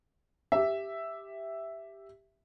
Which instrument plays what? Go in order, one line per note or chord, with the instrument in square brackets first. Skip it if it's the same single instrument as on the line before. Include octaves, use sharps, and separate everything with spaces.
[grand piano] G4 E5